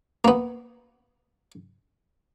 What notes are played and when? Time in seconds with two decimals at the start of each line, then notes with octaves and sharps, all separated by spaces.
0.25 A#3 B3